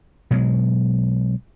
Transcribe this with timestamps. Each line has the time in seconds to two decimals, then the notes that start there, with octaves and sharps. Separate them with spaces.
0.31 B2 F#3 G#3